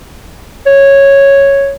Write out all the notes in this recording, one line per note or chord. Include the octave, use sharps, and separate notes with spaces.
C#5